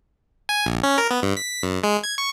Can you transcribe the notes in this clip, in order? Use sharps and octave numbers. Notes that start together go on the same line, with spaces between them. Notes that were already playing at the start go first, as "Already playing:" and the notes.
G#5
A#1
C#4
A#4
B3
G2
B6
F#2
G#3
G#6
C#6